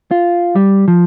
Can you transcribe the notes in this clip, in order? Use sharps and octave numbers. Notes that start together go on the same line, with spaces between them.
F4
G3
F3